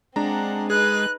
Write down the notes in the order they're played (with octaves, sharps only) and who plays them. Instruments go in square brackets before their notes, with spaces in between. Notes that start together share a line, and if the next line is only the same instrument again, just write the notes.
[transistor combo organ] G#3 [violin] C4 F#5 [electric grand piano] D4 A#5
[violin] D#4 B4 [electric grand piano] G#4 [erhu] F#6